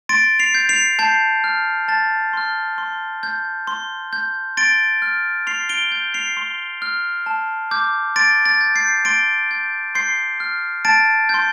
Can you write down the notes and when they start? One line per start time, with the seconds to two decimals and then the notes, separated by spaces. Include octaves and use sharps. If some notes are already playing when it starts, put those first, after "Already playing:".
0.09 C6 A6 D7
0.39 C7 F7
0.54 G6
0.69 C7 F7
0.99 A5 G6 C7
1.44 F6
1.88 A5 A6
2.33 C6 F6
2.78 C6
3.23 G6
3.67 C6
4.13 G6
4.57 C6 A6 D7
5.02 F6
5.47 C6 C7 F7
5.69 D7 G7
5.92 G6
6.14 C7 F7
6.37 C6
6.82 F6
7.26 A5
7.71 D6 G6
8.16 C6 A6 D7
8.46 A6
8.61 G6
8.75 G6 C7
9.05 C6 A6 D7
9.51 G6
9.95 C6 G6 C7
10.40 F6
10.85 A5 A6 D7
11.29 C6 G6